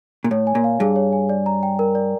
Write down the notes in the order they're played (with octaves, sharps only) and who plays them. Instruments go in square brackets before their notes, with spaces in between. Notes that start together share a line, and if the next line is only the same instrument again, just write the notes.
[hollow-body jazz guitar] A#2
[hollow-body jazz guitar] A2 [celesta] C#5
[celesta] G#5
[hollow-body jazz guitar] A#2
[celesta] F5
[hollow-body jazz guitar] G2 [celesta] G#4
[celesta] C#5
G#5
D5
A#5
G5
A#4
D5